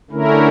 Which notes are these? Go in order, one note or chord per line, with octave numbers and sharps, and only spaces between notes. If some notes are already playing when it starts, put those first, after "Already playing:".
D3 A3 C#4 E4 A#4